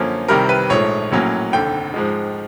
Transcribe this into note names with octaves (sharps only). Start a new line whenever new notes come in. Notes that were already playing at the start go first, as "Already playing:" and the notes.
Already playing: F#2 D3 F3 A#3 C#4
C2 C3 D#3 G3 A#4
B4
A#1 G#2 F3 A3 C#5
A#1 A2 F#3 A#3 C#4
F1 D#2 D3 G5
G#2 F3 G#3